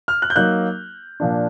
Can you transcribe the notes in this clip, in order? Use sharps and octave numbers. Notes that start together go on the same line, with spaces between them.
F6
F#6
G6
F#3 A#3 D#4 F#6
A#2 F3 A#3 D4